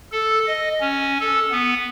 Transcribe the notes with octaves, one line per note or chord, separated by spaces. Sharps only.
A4
D#5
C#4
A4
B3